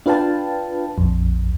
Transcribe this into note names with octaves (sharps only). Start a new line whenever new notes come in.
D4 F4 B4 F5 G5 A5
A#1 F2